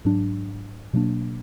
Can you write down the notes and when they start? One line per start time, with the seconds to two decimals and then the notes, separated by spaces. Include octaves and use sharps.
0.05 G#2 F#3 D4
0.93 B2 F#3 A#3 D4